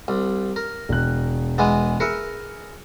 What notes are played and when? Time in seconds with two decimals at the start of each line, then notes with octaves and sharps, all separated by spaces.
0.08 C2
0.56 A#4
0.89 E1 F#6
1.58 E3 G#3 B3
2.00 G#4 A#4 B4 E5 C#7